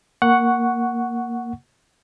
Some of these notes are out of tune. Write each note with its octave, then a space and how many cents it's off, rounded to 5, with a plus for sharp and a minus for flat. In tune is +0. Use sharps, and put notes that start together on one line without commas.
A#3 +0 F#5 +0 C#6 +5